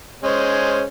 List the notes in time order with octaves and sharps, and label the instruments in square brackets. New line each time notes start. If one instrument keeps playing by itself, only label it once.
[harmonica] G#3 C#4 C5